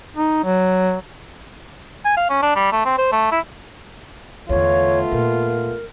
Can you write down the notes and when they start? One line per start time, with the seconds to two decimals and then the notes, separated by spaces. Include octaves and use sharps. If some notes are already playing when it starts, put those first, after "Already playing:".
0.16 D#4
0.44 F#3
2.05 G#5
2.17 F5
2.30 C#4
2.43 D4
2.56 G3
2.72 A3
2.85 C4
2.98 C5
3.12 A3
3.32 E4
4.49 E2 D3 A3 B3 F4 C#5
5.12 A#2 A#4